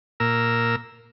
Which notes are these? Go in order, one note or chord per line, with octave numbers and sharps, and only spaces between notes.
A#2 A#4 E6